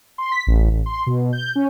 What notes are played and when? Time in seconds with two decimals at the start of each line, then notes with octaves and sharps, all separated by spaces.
0.18 C6
0.32 B6
0.47 A1
0.70 A1
0.86 C6
1.07 B2
1.33 G6
1.56 C#4